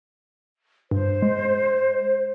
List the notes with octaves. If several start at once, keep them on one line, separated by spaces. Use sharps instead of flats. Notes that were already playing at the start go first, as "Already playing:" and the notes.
G2 C5
G#3